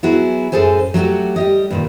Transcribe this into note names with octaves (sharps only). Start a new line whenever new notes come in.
F#3 B3 E4 F#4 G#4
F#2 A2 G#4 A4 C5 G#5
F#3 A3 C#4 F#4 G4
G3 G4 D#5
G2 A#2 D#3